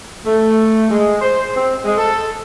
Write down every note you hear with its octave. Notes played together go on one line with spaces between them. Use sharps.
A3
G#3
C5
C4
G#3
A4